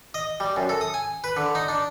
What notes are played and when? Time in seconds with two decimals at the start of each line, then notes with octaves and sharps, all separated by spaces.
0.14 D#5
0.40 G3
0.56 F#2
0.69 A4
0.81 D#6
0.94 G#5
1.24 B4
1.37 D3
1.55 D#4
1.68 D4